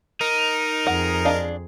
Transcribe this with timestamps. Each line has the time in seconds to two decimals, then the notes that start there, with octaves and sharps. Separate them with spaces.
0.21 D#4 A#4
0.87 F2 G#4 F#5
1.25 D4 D#5 F5